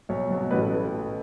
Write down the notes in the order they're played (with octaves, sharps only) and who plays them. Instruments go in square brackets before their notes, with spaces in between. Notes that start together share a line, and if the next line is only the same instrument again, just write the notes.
[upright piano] B1 C#5
B2 F#3
A1 B4
A4